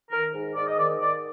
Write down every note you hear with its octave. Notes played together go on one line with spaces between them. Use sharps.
D#3 A#4
G#2
G#2 D5
D#5
D#3 D5
D#3 D5